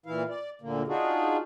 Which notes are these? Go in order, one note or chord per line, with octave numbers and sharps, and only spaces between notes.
A#2 E3 E4 F5
D5
D2 A#2 D3 A#3
D4 D#4 F4 F#4 G#4